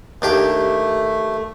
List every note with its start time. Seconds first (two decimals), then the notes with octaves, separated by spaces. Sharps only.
0.22 D#2 A3 D4 G4